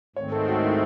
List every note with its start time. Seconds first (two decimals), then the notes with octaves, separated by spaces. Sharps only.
0.16 G#2 D#3 A3 C4 C#5
0.32 A4
0.48 F#4
0.63 E4